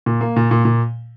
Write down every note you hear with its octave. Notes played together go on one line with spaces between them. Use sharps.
A#2
A#3
A#2
A#2
A#2